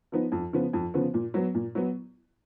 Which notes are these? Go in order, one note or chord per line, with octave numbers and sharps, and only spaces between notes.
F3 B3 D#4
F2
C#3 F3 B3
F2
C#3 F3 B3
A#2
F#3 B3
A#2
F#3 B3